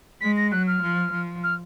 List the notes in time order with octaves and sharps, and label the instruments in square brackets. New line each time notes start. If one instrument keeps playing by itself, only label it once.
[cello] G#3 [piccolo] B6
[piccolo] A#6
[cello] F#3 [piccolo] F#6
[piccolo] F6
[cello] F3
F3
[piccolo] F6